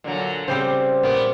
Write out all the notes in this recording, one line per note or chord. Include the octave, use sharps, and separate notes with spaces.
A#2 D3 F#3
C#3 G3 C4 C5
A#2 B3 D5